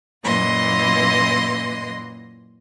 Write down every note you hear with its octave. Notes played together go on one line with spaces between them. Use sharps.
F#2 A#2 E3 D#5 C6